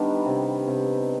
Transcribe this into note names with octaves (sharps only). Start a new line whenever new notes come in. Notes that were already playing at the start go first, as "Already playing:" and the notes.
Already playing: D#3 G3 B3 D4
C3
C3